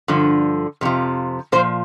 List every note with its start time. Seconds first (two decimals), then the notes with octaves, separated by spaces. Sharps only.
0.08 G2 D3 F3
0.81 F2 C3 F3
1.52 A#2 F3 C5